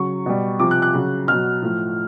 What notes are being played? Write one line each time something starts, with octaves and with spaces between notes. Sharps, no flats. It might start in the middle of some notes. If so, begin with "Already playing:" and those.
Already playing: C#3 F#3 C#6
B2 G3
C3 F3 D6
F#6
F#6
C#3 F#3
B2 F#3 F6
A2 F3